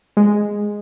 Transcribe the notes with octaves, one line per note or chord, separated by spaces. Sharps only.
G#3